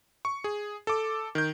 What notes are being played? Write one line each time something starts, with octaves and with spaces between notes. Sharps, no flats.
C#6
G#4
A4 D6
D#3 G6